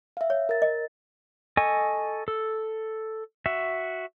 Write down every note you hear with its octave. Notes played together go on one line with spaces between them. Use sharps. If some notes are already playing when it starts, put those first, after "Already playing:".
E5 F5
C#5
A#4 A6
D#5
A4 D#5 G#5 C#6
A4
F#4 E5